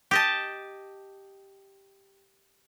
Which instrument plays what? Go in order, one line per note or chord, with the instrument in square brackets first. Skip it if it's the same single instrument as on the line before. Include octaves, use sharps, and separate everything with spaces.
[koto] G4 D#5 A5